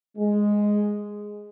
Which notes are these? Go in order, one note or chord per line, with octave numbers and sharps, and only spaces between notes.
G#3